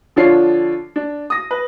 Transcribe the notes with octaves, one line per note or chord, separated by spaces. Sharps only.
D3 F3 D4 F4 C#5 C7
D4
D#6 A#6
B4